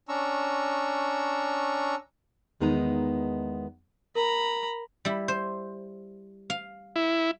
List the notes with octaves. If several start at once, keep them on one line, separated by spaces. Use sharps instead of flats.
C#4 D4 A#5 C#6 E6
E2 D#3 G#3 B3 D#4 A#5
A#4 A#5 B5
G3 E4
C5
F5
E4